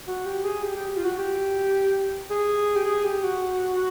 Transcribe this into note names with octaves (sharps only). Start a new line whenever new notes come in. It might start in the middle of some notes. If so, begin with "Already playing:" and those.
F#4
G4
G#4
G4
G4
G4
F4
F#4
G4
G#4
G4
G#4
G4
F#4